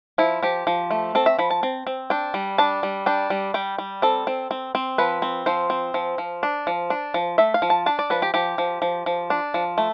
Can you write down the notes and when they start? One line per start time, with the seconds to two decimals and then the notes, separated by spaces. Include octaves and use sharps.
0.18 F3 E4
0.43 F3 G4
0.67 F3
0.91 A3
1.15 C4 A4
1.26 E5
1.38 F3 B5
1.50 A5
1.63 C4
1.87 C4
2.10 D4 G5
2.34 G3
2.58 D4 A5
2.83 G3
3.06 D4 G5
3.30 G3
3.54 G3 G5
3.78 G3
4.02 C4 A4
4.27 C4
4.51 C4
4.75 C4
4.98 F3 B4
5.22 C4
5.46 F3 C5
5.70 C4
5.94 F3
6.18 F3
6.43 D4
6.67 F3
6.90 D4
7.14 F3
7.38 A3 E5
7.54 F5
7.62 F3
7.70 A5
7.86 D4 A5
7.99 D5
8.10 F3 B4
8.22 G4
8.34 F3 G4
8.58 F3
8.82 F3
9.06 F3
9.30 D4
9.54 F3
9.78 A3